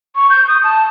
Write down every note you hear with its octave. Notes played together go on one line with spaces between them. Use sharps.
C#6
G6
D#6
A5